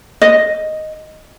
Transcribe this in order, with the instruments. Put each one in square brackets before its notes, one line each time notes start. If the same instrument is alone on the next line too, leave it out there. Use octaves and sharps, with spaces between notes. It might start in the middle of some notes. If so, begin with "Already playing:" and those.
[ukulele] D#5